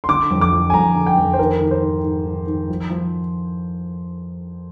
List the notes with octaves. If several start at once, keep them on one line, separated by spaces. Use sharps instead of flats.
C6
D3 D6
F2
D6
F3
G#5
F2 A#5
D3
G5
F2
C5
D#3 A#4
D#3
C5
G#2
G#2
D#3
D#3
F3
F3